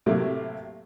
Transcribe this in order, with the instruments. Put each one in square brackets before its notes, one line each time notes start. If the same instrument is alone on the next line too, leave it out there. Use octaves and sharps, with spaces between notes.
[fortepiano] A2 C3 F#3 A3 A#3 G4